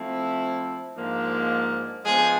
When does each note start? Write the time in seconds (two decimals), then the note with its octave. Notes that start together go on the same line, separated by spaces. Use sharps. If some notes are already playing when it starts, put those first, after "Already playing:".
Already playing: F3 A3 C4 E4
0.97 G#2 F3 A#3 D4
2.05 F3 G#3 B3 D4 G#4